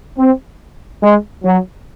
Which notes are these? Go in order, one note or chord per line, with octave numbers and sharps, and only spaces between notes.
C4
G#3
F#3